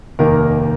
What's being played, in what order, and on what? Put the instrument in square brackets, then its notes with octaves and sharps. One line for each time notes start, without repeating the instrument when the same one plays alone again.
[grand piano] F1 D#2 D#3 A#3 A#4